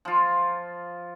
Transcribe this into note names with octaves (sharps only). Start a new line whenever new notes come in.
F3 F4